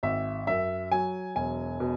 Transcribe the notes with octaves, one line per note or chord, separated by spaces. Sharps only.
G#1 E5
F#2 E5
F#3 G#5
E1 G#5
B2